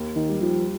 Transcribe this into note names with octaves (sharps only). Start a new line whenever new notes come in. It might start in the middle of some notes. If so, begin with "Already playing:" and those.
Already playing: D#2
D#3
G3
F3